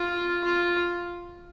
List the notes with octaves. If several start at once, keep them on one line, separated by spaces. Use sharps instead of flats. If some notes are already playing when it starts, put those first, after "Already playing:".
Already playing: F4
F4